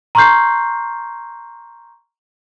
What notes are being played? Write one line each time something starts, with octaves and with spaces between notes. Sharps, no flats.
A#5 C6 C#6 F6 G6 C7